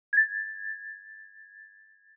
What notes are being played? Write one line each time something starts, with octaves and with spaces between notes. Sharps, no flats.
G#6 A6